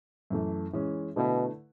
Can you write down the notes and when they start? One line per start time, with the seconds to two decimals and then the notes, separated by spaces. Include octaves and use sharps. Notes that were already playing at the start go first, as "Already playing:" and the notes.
0.30 F#2 E3 A3
0.73 E3 G#3 C#4
1.16 B2 D3 A3 E4 B4